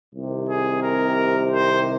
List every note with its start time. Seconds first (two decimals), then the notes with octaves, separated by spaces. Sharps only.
0.14 C2 C3 D#3
0.48 G#4
0.83 A#4
1.51 C5